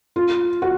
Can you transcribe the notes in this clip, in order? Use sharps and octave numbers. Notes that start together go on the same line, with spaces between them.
F4
F#4